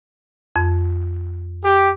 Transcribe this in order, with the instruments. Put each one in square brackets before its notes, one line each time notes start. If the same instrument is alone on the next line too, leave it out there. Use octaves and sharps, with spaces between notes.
[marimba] F2
[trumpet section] G4